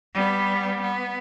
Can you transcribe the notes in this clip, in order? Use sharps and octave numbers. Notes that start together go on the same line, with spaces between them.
G3 B3
B3